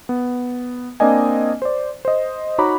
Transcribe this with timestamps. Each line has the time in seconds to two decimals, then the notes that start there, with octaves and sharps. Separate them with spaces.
0.09 B3
1.00 A#3 C4 D4 D5 D#5 G#5
1.62 C5 D5
2.05 C5 D#5
2.58 D#4 F#4 C#5 A#5 B5 D6